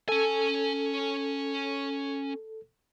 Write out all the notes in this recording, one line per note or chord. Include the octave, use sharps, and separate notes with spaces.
C#4 A4 G#5